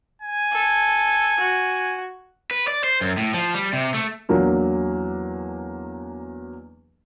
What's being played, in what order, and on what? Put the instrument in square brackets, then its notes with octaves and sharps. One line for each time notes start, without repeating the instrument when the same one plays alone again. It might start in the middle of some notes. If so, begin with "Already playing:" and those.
[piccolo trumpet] G#5
[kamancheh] A4
F#4
[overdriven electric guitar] B4
D5
C5
F#2
A2
F3
G3
C3
A3
[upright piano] E2 F#3 A#3 D4